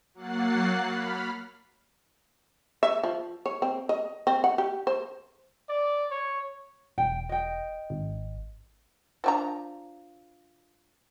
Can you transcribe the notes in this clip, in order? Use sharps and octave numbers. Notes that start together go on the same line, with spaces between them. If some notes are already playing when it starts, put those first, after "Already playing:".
F#3 A#3 F#5 F#6 A6 C7
B5 F6
E5
F3
C#5
C4
D#5
C4
F#5
G4
C5
D5
C#5
E1 G5
D#5 G5
G#1
F3 D4 A#5